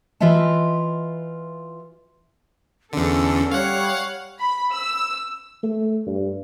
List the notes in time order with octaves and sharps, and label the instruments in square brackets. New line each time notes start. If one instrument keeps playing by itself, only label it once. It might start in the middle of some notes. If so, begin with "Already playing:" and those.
[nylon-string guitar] E3 F4 D#5 E5 A5
[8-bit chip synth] E2 D3 [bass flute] C#4 [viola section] A4
[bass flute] G3 [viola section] C#5 [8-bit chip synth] F5 F#5
[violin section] B5
E6
[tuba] A3
G2